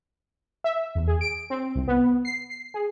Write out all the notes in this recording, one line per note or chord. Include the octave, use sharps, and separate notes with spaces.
E5
E2
G#4
D7
C4
C2
B3
C7
C7
G#4